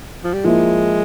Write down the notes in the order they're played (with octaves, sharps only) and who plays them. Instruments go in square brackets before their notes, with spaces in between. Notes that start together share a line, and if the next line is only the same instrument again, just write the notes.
[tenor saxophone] F3
G3
[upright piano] F3 A#3 E4 [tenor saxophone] G#3